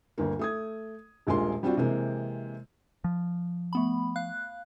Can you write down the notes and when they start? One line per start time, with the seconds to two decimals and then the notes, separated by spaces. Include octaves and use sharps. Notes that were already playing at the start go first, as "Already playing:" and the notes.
0.18 G1 D2 A#3
0.39 A3 D#6 G#6
1.27 D#1 A#1 G#3 A#3 F4 C6
1.63 G3 C4 D4 F4 F#4
1.77 C3 E3 G#3 A#3 C4
3.04 F3
3.73 A3 B3 B5
4.16 F5 F#6